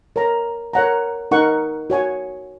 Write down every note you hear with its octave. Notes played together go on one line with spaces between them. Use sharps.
A#4 C#5 A#5
A#4 C#5 F#5 A#5
D#4 A#4 F#5 C#6
F#4 C#5 G#5